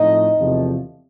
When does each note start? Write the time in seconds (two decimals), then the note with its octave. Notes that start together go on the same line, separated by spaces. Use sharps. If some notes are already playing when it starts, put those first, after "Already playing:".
Already playing: A2 F3 A3 C4 D#4 D#5
0.37 E2 C3 F3 A3 C4